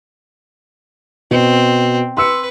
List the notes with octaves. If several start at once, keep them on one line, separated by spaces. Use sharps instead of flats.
B2 C4
B4 C6 E6 C#7